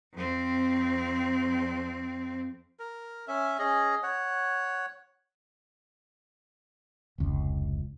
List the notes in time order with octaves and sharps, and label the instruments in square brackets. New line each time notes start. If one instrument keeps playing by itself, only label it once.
[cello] F2 C4
[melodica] A#4
C#4 E5
C#4 G#4 D#5
C#5 F#5
[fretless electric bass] F1 C#2